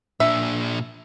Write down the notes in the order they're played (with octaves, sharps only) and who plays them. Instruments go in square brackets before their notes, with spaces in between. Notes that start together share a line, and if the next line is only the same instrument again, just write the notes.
[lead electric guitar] A#2 D4 [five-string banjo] E5